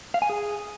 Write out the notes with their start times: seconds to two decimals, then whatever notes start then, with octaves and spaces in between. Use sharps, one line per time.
0.14 F5
0.22 G#5
0.29 G#4